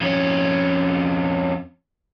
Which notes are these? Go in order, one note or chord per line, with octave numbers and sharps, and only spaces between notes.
F2 C#4